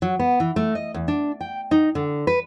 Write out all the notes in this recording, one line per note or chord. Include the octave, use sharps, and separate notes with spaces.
F#3
B3
E3
A3
D#5
E2
D4
G5
D#4
D3
B4